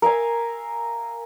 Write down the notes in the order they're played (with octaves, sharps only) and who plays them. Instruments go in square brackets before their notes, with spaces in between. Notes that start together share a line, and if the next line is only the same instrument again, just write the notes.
[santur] A#4 E5 F5 G#5